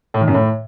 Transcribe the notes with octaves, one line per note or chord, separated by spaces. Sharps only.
A2
D#3
F#2
A2